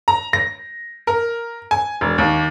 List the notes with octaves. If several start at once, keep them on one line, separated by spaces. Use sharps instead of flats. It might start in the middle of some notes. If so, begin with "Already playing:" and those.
A#5
A#6
A#4
G#5
E1
D#2